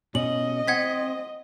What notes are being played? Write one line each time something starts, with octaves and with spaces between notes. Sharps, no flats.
B2 C#4 D#5 F#7
C4 F#5 G#6 B6